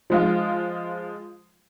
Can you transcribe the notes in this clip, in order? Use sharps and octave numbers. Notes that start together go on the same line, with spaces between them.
F3 G#3 F4